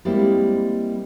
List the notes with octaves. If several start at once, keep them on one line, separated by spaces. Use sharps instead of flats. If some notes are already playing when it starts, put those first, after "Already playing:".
G3 G#3 A#3 C4 E4